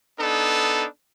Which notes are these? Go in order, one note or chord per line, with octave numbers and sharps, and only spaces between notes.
B3 D4 D#4 A4